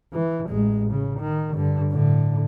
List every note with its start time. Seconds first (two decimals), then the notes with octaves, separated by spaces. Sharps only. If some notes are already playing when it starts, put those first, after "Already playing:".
0.13 E3
0.49 A1 G#3
0.91 C#3
1.20 D#3
1.53 G2 D3
1.91 A2 D3